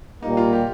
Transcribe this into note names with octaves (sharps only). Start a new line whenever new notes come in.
A#2 G3 A#3 D#4
F4
G4